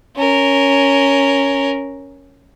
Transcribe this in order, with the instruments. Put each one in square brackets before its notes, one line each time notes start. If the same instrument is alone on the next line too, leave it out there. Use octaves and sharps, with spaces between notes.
[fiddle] C#4 A#4